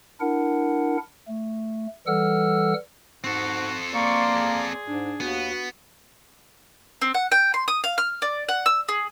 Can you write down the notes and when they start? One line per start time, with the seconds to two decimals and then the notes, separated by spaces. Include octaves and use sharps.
0.20 D4 E4 A#4 F#5
1.28 A3
2.07 E3 G3 A4 F#5 E6 F6
3.24 G#2 C4 F#4 A4
3.94 A#3 D5 C6 C#6
4.34 G#4
4.88 G#2 D4
5.21 D#2 B3 F#4
7.01 C4
7.14 F#5
7.32 G5
7.54 C6
7.68 D#6
7.84 F5
7.98 F6
8.22 D5
8.49 F#5
8.66 E6
8.89 G#4